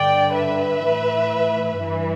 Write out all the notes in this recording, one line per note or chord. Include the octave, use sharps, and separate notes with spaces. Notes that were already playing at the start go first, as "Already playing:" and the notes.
Already playing: G2 D3 D5 G5
B4 E5
A2 E3
G2 E3